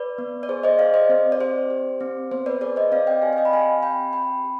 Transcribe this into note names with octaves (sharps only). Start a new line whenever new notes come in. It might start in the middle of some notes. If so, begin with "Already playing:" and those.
Already playing: B4 D5
B3
D5
G#4 C5
C5 D#5
G#4 D5 F5
C5 D#5
C4 C5
D5
G4 C5
G4
C4
B3 C5
B4 D5
G#4 B4 D5
C5 D#5
C4 D5 F5
D#5 G5
G4 F5 G#5
F5
D#5 G5
B5
C4 F5 G#5
C4 G5 B5
G4 G5 B5
G4